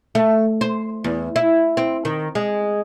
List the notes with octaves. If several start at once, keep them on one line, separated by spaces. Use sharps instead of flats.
A3
C5
E2
E4
C4
D#3
G#3